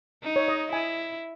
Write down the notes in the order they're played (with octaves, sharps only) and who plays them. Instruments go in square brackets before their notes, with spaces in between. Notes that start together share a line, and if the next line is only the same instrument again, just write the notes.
[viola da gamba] D#4
[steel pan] C#5
D#5
[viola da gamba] E4 [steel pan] G#5